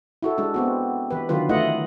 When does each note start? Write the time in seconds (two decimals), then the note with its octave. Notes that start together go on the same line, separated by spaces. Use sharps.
0.22 E4 F#4 A4
0.38 G#3 D4
0.54 B3 C4 F#4
1.10 E3 G4 B4
1.29 D3 D#3 F#3 F4 B4
1.49 E3 A3 E4 F4 D#5 F#5